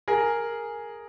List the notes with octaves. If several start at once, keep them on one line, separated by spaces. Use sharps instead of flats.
G#4 A#4